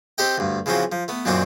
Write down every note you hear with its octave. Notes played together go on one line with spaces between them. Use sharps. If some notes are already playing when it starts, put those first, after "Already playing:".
C4 G4 A4 D#5 G5
D2 G2
C#3 E3 F3 C4 F#4
F3
A3 B3
F#2 A#2 D#3 C4 D4 F#4